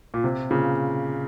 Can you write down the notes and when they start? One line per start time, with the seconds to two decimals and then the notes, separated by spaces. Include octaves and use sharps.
0.14 A#2
0.24 C3
0.51 A#2 C#3